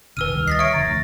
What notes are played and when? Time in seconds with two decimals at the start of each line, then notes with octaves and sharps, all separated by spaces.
0.17 E1 C3 D#3 B4 E6 F6 D#7
0.34 D2 D#3 G3
0.48 D#5 A6 B6 C7
0.59 C#5 E5 C#7 D7
0.74 E1 D3 F3 A#5 A6
0.87 D2 F3